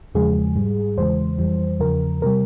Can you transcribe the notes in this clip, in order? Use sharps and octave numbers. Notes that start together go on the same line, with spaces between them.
E2 C#3 F3 G#3 G#4
G#2 G3
E2 C#3 E3 G#3 C5
F2 E3 G3
E2 C#3 F3 A#4
C3 G3 A#4